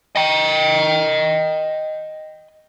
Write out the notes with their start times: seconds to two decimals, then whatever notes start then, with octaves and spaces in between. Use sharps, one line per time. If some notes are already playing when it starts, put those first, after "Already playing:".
0.16 D#5 G5